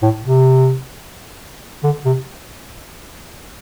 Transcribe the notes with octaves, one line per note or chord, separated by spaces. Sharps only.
A2
C3
D3
C3